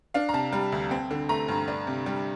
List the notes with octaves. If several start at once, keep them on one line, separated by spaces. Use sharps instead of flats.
D4 F5
A#5
C3 A5
G3
D2
C4
D3
A3 A#5
G2
D4
C3
G3